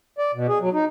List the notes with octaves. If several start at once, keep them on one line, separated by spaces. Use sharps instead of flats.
D5
B2
G#4
F#3
D#4